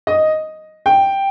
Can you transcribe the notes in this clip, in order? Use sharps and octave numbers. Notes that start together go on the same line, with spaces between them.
D#5
G5